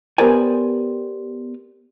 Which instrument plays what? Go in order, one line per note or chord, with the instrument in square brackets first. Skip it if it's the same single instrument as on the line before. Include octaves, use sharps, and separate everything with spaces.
[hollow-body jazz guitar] B3 G4 A#4 C5 D5 G#5